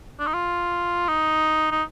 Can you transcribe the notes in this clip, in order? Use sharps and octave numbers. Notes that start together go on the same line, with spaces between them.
D4
D#4
F4
D#4
D#4